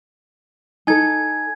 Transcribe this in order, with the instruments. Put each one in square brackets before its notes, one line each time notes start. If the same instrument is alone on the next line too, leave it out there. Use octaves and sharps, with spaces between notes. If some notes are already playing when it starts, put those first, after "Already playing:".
[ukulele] D#4 A4 [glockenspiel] G#5 G#6